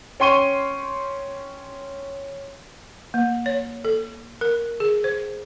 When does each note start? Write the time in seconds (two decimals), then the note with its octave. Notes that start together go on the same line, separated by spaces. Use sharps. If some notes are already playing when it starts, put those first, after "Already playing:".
0.20 C#4 G5 C6 C#6 D#7 G7
3.14 A#3
3.46 C#5
3.85 A4
4.41 A#4
4.80 G#4
5.04 C5